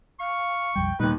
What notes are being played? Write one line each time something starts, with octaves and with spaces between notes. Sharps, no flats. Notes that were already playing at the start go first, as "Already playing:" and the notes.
F5 C#6
B1 F2 G3 G5
D#2 A#2 G3 D#4 B4